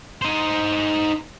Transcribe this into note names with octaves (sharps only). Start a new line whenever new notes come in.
D#4 C5